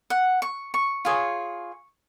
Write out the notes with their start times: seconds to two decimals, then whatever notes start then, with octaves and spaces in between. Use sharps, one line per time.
0.10 F#5
0.42 C#6
0.74 C#6
1.05 F4 G#4 C#5